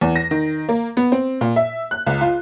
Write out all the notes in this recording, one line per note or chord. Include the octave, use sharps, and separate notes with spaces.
E2
A#6
D#3
A#3
B3
C4
A#2
E5
F#6
C#2
F4